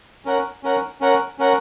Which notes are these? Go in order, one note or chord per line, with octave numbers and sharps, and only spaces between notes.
C#4 A#4 F#5
C#4 A#4 F#5
C#4 A#4 F#5
C#4 A#4 F#5